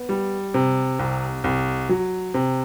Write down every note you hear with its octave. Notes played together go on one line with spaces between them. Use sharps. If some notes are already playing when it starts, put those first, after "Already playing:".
Already playing: B3
G3
C3
C2
C2
F#3
C3